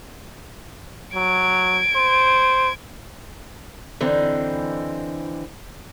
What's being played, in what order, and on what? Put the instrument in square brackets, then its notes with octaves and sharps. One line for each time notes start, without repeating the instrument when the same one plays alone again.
[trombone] F#3 [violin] G#6 D7
[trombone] C5
[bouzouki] D3 E3 C4 D#4